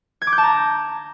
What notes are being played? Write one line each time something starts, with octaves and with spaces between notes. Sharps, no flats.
G#6
D6
G6
A5
A#5